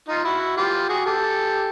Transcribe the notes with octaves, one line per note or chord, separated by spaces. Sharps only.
D#4 F4
E4 F#4
F4 G4
F#4 G#4
G4 A4